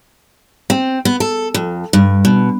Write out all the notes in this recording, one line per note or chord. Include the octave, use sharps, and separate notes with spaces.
C4
B3
A4
F2
G2
B2